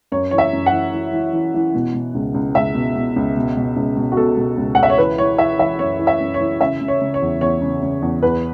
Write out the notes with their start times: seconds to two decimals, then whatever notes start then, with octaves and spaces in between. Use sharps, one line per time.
0.12 F#2 C#5
0.31 E3 C#5
0.38 E5
0.53 F#2
0.66 F#5
0.72 E3
0.93 E3
1.13 E3
1.33 E3
1.54 E3
1.74 B2
1.94 B2
2.15 C#2
2.34 C#2
2.55 C#2 E5
2.75 B2
2.95 B2
3.16 C#2
3.37 B2
3.57 B2
3.76 C#2
3.97 B2
4.12 F#4
4.17 B2 A4
4.37 B2
4.58 C#2
4.75 C#2 F#5
4.83 E5
4.90 C#5
4.98 E3 B4
5.18 E3 C#5
5.38 E3 E5
5.59 E3 E5
5.79 F#2 C#5
5.99 E3
6.07 E5
6.20 F#2
6.34 C#5
6.40 E3
6.61 C#3 E5
6.81 C#3
6.88 C#5
7.01 C#3
7.14 C#5
7.22 E2
7.41 E2 C#5
7.62 C#3
7.83 C#3
8.02 E2
8.22 E2 B4